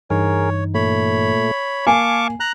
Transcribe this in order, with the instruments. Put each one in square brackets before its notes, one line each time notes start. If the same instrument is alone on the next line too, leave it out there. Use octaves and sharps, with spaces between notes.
[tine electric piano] G2 E3 D#4 [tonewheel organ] G#4 A#4 [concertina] C#5
[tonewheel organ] A#2 A3 [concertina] C#5 B5
[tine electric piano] A#3 C7 [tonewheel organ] F5 A5 C#6 [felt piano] G#5 [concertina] D6
[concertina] A#5 F#6